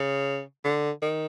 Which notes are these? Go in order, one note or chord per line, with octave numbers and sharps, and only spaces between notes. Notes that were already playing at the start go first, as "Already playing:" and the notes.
Already playing: C#3
D3
D#3